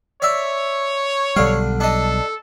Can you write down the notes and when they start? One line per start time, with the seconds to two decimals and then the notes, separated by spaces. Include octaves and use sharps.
0.22 C#5 D5 E5
1.36 B1 D3 G3 F5
1.80 D4 A4 D#5